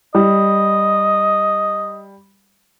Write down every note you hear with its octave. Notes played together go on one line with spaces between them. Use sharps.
G3 D#5